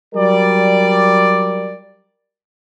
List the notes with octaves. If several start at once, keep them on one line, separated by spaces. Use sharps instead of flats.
F#3 G3 A#4 D5